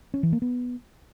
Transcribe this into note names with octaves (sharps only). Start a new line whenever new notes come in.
C#4
E3
A#3
B3